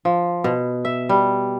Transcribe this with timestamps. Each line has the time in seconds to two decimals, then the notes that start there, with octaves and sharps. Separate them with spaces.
0.05 F3
0.44 B2
0.85 E5
1.09 G3